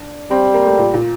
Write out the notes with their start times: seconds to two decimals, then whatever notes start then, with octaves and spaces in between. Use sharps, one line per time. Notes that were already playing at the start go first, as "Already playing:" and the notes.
Already playing: D4
0.31 G3 C4
0.54 A#3
0.66 A3
0.78 A#2
0.94 A#2